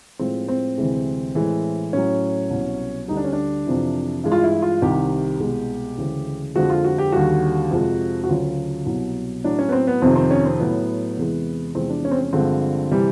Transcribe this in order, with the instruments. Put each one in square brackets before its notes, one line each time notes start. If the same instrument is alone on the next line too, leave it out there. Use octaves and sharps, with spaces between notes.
[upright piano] A2 F3 G#3 C4
C4
D2 C3 E3 G#3
A2 E3 G#3
A2 F#3 C#4
C2 B2 F#3
D2 D3 G3 D#4
D4
C#4
D4
F2 C3 E3
G2 E3 G#3
F4
E4
F4
C2 C3 D#3 G3 G4
C2 B2 G#3
D2 C#3 E3 G#3
F2 D3 F3 G#3 F#4
F4
F#4
G4
D#2 D3 G3 F#4
F2 C3 F3 G#3
F#4
D2 C#3 F#3 F4
C2 B2 F#3
A2 F#3 D4
C#4
B3
C4
B3
F2 C3 D#3 C4
C4
C#4
C4
A2 F#3 B3
E2 C3 E3 G#3
E2 C3 F3 G#3 C4
D4
C#4
C4
C#4
G2 D3 F3 G#3 C4
C3 E3 G3